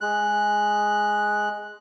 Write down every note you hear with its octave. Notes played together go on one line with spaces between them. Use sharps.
G#3 F#6